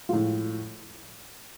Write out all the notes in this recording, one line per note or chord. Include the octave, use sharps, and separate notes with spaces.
A2 F3 G#3 F4